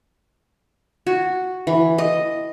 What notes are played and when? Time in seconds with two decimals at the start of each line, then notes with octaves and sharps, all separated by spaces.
1.07 F#4
1.67 E3
1.98 D#5